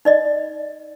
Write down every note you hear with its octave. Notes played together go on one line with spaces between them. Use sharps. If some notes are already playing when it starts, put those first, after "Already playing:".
D#4 D5 D#5